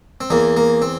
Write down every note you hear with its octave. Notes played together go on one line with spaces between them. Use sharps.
C4
E2 E3 A#3
A#3
C4